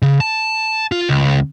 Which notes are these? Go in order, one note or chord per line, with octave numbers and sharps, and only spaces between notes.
C#3
A5
F4
C#2